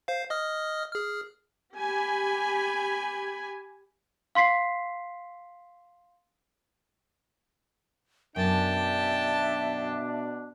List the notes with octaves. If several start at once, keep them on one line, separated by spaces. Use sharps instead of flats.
C5 F5
D#5 D#6 F6
G#4 F6
G4 G#5 B5
F5 C6 B6 C7
F#2 B2 D4 E5 G5 A5